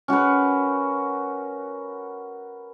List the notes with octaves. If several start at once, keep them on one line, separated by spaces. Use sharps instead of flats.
C#4 F#4 A#4 B4